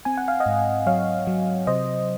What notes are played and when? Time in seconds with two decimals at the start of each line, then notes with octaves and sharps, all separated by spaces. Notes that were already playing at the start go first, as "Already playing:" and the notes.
0.05 C4 G#5
0.17 F#5
0.28 F5
0.40 D#5 F#5
0.46 G#2
0.86 F#3 C#5 F5
1.27 F#3
1.67 C3 C5 D#5